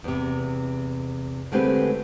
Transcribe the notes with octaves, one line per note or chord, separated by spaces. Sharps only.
E2 C3
D3 G#3 A3 C4 G4 B4